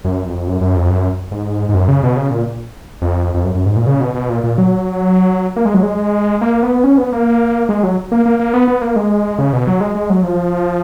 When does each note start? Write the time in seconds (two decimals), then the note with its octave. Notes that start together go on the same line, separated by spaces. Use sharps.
0.05 F#2
0.26 F2
0.47 F#2
0.61 F#2
0.76 F2
0.89 F#2
1.31 G#2
1.69 G#2
1.74 F#2
1.88 C#3
2.03 B2
2.16 C#3
2.31 A#2
3.02 F2
3.34 F2
3.44 F#2
3.55 F#2
3.66 G#2
3.76 A#2
3.87 C#3
4.00 B2
4.15 B2
4.30 A#2
4.44 A#2
4.58 F#3
5.56 A#3
5.65 G#3
5.74 F#3
5.83 G#3
6.41 A#3
6.63 B3
6.84 C#4
6.98 B3
7.12 A#3
7.69 G#3
7.83 F#3
8.12 A#3
8.26 A#3
8.39 A#3
8.54 B3
8.68 B3
8.82 A#3
8.96 G#3
9.39 C#3
9.53 B2
9.67 F#3
9.81 G#3
9.95 G#3
10.10 F#3
10.23 F3